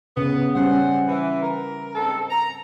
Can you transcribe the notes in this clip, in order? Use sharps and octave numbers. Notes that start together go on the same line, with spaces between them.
C#3 B3
G3 C#4 C5 F#5
E3
A#4
G#2 C4 A4
A#5